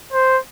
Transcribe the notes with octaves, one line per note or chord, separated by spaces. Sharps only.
C5